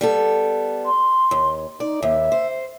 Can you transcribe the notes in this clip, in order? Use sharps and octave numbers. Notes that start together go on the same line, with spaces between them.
G3 B3 A4
C6
D#2
D#4 D5
D#2 E5
C5